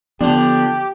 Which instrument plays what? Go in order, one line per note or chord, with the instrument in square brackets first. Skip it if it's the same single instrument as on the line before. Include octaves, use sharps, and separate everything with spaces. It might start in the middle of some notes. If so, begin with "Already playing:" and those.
[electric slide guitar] D3 F3 [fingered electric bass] B3 [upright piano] D4 [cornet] G4